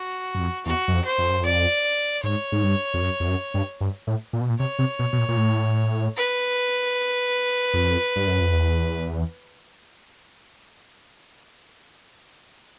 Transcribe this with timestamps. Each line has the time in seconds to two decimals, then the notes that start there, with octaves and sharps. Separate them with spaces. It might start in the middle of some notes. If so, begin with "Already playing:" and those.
Already playing: F#4
0.35 F#2
0.40 F2
0.66 E2 F#4
0.88 F#2
0.93 F2
1.05 C5
1.18 F2
1.30 F#2
1.42 F2 D5
2.23 G#2 C#5
2.52 G#2
2.63 G2
2.94 F2
3.02 F#2
3.20 F2
3.28 F#2
3.54 G2
3.81 G2
4.07 A2
4.33 A#2
4.41 B2
4.49 A#2
4.59 C3 C#5
4.79 C3
4.99 B2
5.13 B2
5.18 A#2
5.28 A#2
5.37 A2
6.17 B4
7.74 F2
8.16 G2
8.27 F#2
8.41 F2
8.53 E2